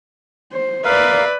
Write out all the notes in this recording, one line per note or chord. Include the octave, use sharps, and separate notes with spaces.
C5
A#4 B4 D5 E5 F5